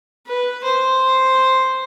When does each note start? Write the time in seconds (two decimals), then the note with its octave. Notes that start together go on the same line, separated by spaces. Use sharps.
0.26 B4
0.63 C5